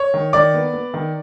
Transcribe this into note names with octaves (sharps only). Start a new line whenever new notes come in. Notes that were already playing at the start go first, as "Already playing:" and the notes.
Already playing: C#5 C#6
D#3
D#3 D5 D6
B3
B3
D#3